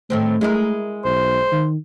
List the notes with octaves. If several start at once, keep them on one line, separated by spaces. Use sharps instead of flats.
A2 D#3 A3 C4
G#3 E4 A#4
B1 C5
D#3